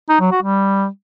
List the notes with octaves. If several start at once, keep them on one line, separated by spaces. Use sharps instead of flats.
D#4
F#3
F#4
G3